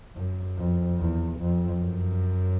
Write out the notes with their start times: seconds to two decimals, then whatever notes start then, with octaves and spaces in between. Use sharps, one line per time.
0.17 F#2
0.58 F2
0.99 E2
1.40 F2
1.82 F#2